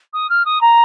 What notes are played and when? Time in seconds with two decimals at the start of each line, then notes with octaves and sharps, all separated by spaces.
0.13 D#6
0.30 F6
0.45 D#6
0.61 A#5